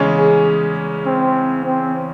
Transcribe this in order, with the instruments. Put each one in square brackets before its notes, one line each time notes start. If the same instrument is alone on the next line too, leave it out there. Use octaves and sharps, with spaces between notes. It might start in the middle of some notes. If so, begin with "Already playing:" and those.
Already playing: [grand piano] E2 C#3 G#3 C#4
[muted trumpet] G#4
C4
C4